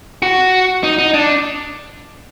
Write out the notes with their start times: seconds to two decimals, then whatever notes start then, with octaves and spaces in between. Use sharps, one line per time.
0.22 F#4
0.83 D#4
0.99 D#4
1.14 D4